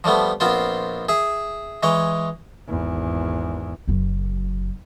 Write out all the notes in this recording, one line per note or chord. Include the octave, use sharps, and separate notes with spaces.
F3 G3 A3 B3
A#1 B3 C4 F4 C5
G#4 E5
E3 G#3 C#5
G#1 E2
F#1 F#2